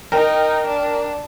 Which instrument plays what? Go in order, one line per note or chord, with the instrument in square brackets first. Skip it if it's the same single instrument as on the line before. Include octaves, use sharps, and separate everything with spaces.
[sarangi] D#4 [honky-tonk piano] A#4 G5
[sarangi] D4